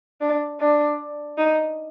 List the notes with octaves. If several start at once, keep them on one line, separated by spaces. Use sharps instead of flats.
D4
D4
D#4